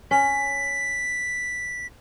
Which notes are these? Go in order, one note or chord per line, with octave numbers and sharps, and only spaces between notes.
C#4 B6